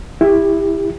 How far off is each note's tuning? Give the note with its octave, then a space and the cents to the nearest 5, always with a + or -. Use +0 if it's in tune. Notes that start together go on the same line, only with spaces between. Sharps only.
E4 +0 G4 +25